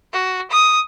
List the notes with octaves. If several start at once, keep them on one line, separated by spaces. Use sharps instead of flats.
F#4
D#6